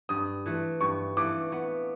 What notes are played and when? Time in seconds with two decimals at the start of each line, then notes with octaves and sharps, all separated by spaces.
0.09 G2 D#6
0.46 E3 A3
0.81 G2 C#6
1.17 E3 A3 D6
1.52 B3